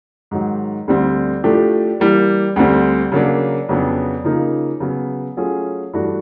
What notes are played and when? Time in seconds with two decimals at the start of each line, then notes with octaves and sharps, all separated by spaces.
0.31 G#2 D#3 F#3
0.88 D2 D3 G3 C4
1.44 A2 F3 A3 D4 G4
2.00 E3 G3 A#3
2.56 D2 D3 G3 C4
3.12 C#3 F#3 A#3 D4
3.69 F2 C#3 F#3 B3 D4
4.24 C#3 F3 A#3 D#4
4.80 C#3 F#3 B3
5.37 F#3 A3 C#4 F4 G#4
5.93 G2 E3 A3 D4 F#4